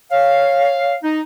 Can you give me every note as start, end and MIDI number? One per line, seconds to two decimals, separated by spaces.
0.11 0.95 73
0.11 0.96 77
1.03 1.21 63